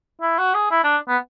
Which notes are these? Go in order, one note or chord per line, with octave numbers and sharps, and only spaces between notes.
E4
F#4
G#4
E4
D4
B3